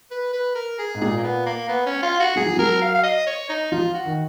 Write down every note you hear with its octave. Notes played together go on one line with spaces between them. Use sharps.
B4
B4
A#4
G#4
G#2
A#2 G#4
A#3
B3
A#3
B3
C#4
F4
F#4
F#3 G#4
F3
F#3 A#4
F5
F5
D#5
C#5
D#4
F3 F4
F#4
D#3